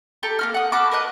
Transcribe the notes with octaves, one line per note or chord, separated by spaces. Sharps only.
G4 A4 A#5
A#3 F#4 F6
F#5 D#6
F#4 A5 B5 D6
A#4 B4 D#5 F#6